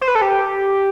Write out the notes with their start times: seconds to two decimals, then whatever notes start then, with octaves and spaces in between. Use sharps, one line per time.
0.01 C5
0.08 B4
0.15 A4
0.22 G4